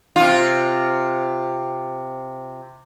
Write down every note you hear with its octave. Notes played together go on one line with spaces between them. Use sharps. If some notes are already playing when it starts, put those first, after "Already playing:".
C3 F4